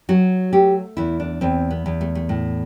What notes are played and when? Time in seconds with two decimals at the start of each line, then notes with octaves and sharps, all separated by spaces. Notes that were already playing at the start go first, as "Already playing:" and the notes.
0.09 F#3 F#4
0.53 A3 G4
0.97 E2 E4
1.20 D4
1.41 E2 C4
1.70 B3
1.86 E2
2.01 A3
2.15 A3
2.29 A2